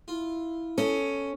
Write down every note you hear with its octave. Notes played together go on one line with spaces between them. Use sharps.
E4 F4
C#4 A4 D#5